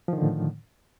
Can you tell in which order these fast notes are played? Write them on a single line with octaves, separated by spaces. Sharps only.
F3 D#3 D3 A2